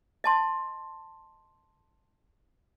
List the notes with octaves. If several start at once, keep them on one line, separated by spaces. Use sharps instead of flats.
D#5 A5 C6